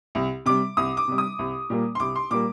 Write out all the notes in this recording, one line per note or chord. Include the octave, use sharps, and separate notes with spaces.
C2
C3 G3 D6
C2 D#6
D6
C3 G3
D#6
C2
A#2 G3 A#3
C6
C2 D6
C6
A#2 G3 A#3 D6